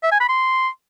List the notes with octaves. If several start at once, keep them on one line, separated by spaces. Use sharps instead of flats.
E5
G#5
B5
C6